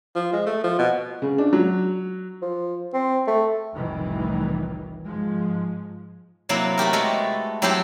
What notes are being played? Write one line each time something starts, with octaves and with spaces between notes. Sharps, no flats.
F3
G#3
A3
F3
B2
C#3
D4
F#3
F3
C4
A3
F1 C2 A2 D#3 E3
G#2 F3 G#3
C3 F#3 A#3 E4 A5
A3 F#4 G4 A#4
G#3 A3 B3 A4
F#3 C4 E4 G4 A4 C5